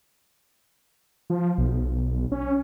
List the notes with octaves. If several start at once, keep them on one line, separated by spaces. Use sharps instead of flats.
F3
B1
C#4